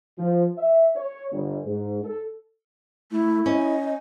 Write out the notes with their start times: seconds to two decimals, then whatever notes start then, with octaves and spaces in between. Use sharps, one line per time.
0.18 F3
0.58 E5
0.96 C#5
1.31 G1
1.65 G#2
2.04 A4
3.12 A3 E4
3.46 C#4 D#5